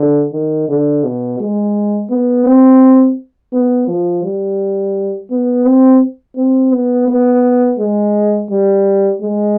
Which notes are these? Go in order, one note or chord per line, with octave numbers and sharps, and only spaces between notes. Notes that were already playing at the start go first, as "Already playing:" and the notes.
Already playing: D3
D#3
D3
B2
G#3
B3
C4
B3
F3
G3
B3
C4
C4
B3
B3
G#3
G3
G#3